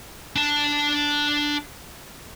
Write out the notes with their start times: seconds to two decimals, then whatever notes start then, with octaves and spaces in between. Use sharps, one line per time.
0.36 D4 A5